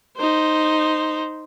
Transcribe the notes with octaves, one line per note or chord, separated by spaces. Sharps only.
D#4 C5